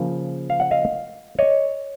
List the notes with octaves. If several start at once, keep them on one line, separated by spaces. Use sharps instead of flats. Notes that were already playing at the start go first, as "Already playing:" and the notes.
Already playing: C#3 F3 A#3
F5
F#5
D#5 F5
C#5 D#5